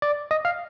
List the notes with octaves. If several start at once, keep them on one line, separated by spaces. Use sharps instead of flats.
D5
D#5
F5